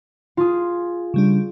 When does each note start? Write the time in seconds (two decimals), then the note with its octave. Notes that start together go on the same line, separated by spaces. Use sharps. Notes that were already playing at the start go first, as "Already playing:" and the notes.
0.37 F4 G#4
1.14 C#3 G3 D4